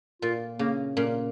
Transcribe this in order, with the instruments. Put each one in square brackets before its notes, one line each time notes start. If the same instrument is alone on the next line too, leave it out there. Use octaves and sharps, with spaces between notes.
[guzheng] A#2 [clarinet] F4
[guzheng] C#3 [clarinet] A#3
[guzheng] A#2 [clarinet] C#4